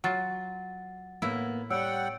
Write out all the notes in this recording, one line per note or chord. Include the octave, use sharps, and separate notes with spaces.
F#3 F4 F#5 A6
A2 A#3 B3 E4
G3 C#5 F#5 G5 E6